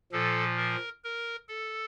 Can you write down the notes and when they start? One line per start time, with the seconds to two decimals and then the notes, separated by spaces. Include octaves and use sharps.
0.12 A#2 F3 A4
0.57 A#4
1.04 A#4
1.49 A4